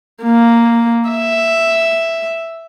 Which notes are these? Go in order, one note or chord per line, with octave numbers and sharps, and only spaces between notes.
A#3
E5